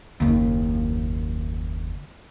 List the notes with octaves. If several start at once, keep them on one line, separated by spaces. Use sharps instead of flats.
F#1 D#2